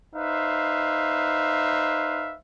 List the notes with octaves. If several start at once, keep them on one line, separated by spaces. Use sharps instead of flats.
D#4 B4 C5 E5 F5